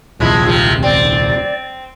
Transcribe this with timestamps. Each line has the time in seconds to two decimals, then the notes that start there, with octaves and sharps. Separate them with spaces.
0.20 D#1 C2 F3 G#3 E4
0.46 C3 F3
0.83 C4 D5